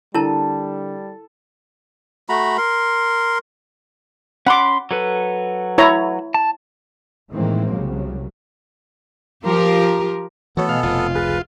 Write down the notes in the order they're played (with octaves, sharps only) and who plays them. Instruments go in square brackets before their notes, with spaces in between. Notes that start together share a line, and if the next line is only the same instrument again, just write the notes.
[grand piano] D3 [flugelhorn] G3 [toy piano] E4 A#4 A5 [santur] A4
[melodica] A3 F#4 A#5 B5
A#4 C6
[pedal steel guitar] C#4 B5 C6 [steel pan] F#5 D6
[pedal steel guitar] F#3 A4 B4
[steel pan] E4 C#5 A#5
[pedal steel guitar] A5
[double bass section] A2 D#3 E3 G#3 A#3 C4
C2 C#3 F#3
[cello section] F3 F4 G4 A#4
[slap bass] E3 F3 A3 [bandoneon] B3 A4 [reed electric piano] F#4 C#5
[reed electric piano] B2 D#5 G#5 [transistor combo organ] F5
[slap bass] F1 F2 [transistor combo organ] F4
[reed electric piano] C#2 G#4 A6 [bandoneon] B4